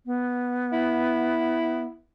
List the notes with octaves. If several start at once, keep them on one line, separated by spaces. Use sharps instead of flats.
B3
E4